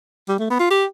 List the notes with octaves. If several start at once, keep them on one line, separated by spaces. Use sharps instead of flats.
G3
A3
B3
F4
G4